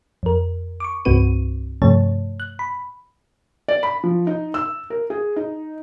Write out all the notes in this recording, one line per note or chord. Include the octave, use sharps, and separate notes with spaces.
F2 A#4
C#6 D6
C2 G2 C4 F#4 B4 D#7
G2 C3 F3 A3 C#5 A5
F#6
B5
D5
B5
F3
D#4
E6
A#4
G#4
D#4